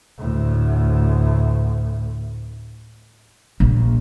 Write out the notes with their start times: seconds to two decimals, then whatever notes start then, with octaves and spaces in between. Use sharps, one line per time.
0.19 D2 A2
3.60 A#1